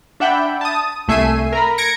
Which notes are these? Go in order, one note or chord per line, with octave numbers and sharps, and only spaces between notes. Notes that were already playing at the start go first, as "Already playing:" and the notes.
D4 E5 F#5 G5 B5
A5 D#6
C2 A3 E5 G#5 C7 D#7
A#4 A#5 B5
G#6 A#6 C#7 D7